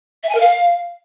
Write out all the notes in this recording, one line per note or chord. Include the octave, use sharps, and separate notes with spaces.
E5
G#5
A#4
F5